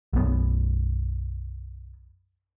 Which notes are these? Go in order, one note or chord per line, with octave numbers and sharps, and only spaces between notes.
B1 F#2 B3